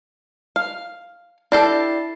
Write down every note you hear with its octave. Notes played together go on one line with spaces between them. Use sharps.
F5
D4 E4 G4 A4 D5 C7